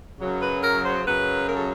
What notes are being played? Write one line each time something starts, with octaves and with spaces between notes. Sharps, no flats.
F#2 C#3 F#3
B4
A#4
C5
F#2 C#3 F#3 B4
A#4
A4